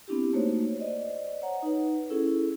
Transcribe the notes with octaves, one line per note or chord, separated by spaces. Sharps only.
B3 C4 D4 E4 G4
A3 A#3 D#4 F#4 C5 C#5
C5 D5 D#5
C#5 F#5 A#5
D#4 B4
C#4 E4 G#4 A4